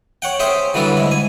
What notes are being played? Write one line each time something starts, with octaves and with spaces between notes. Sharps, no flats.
C#5 F#5 G5
C#4 G#4 C5 C#5 E5 G5
D3 E3 F#3 G3 D4 A4
G#2 E4
G#5